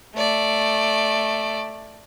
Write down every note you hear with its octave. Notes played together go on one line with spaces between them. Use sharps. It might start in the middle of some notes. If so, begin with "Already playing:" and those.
A3 D5